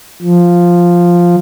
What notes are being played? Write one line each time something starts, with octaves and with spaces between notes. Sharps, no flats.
F3